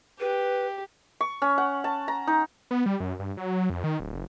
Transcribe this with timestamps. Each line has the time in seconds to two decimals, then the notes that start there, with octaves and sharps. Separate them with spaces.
0.20 G4 B4
1.21 C#6
1.42 C#4
1.58 F#5
1.84 A5
2.08 A#5
2.27 D#4
2.71 B3
2.86 G3
3.00 F#2
3.19 G2
3.37 F#3
3.70 F2
3.84 D#3
4.00 D1
4.14 F#1